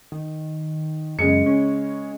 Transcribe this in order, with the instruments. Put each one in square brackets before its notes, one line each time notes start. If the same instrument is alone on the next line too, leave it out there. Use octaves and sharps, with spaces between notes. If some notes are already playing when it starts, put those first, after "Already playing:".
[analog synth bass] D#3
[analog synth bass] F#2 [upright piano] C#3 G#3 C#7
[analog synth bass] C#4